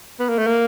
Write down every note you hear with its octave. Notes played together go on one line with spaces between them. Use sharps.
B3
A#3
A3
A#3